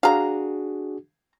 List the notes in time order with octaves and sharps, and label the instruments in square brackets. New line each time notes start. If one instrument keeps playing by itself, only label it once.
[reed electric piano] D4 F#4 G#4 [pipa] F5 A#5